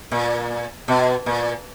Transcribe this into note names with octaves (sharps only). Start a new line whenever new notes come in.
A#2
B2
A#2